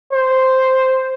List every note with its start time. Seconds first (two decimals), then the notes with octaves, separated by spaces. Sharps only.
0.13 C5